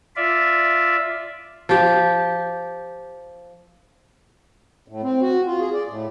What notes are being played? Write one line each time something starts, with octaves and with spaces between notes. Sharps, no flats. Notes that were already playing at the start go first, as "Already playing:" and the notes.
F4 D5 E5
F3 G4
A2
C4
F#4
F4
G#4
D5
A2